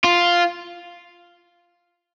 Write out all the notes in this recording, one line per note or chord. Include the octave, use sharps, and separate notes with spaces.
F4